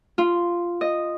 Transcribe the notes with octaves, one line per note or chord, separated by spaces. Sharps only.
F4
D#5